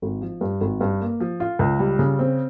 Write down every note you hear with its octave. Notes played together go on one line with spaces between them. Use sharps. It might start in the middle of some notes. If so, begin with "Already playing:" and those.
G#1
F3
G2
G#1
G2
A#3
F3
F4
C#2
G3
C#3
C4